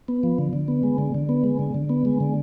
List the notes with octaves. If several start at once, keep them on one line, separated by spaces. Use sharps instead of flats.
B3
F3
D3
D3
B3
G#3
D3
D3
B3
G#3
D3
D3
B3
G#3
D3